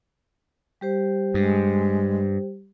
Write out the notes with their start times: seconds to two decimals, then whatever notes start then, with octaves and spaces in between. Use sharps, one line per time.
0.81 G3 G4 C5
1.34 G2 G#3